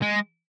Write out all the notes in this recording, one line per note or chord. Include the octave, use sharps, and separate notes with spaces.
G#3